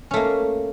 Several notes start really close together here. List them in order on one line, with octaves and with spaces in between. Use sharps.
C#4 A3 A#3